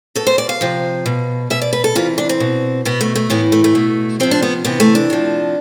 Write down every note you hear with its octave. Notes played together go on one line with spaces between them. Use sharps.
B2 A4
C5
D5
F5
C3 F3
B2
B2 E5
D5
B4
A4
C3 E3 F4
D4
C4
B2
B2 B3
A3
A3
A2 E3 B3
A3
A3
B2
C3 F3 C4
D4
B3
C3 E3 B3
A3
D4
C3 F3